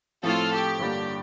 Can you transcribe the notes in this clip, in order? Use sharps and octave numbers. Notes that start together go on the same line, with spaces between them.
A2 F3 C4 F4 A4
G4
G2 D3 G3 A#3 D4